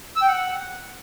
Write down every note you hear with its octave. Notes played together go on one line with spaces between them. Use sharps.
E6
G5
F#5